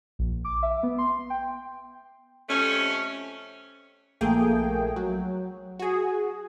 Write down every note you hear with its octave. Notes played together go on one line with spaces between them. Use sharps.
A#1
D6
E5
B3
C6
G5
F2 C3 A3 C#4
A#1 A3 A#3 G#4 G5
F#3
F#4 G#4